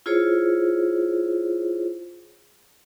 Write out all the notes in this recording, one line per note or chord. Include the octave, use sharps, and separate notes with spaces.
E4 F4 G#4 C5 C#5